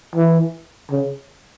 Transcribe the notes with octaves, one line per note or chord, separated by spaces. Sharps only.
E3
C#3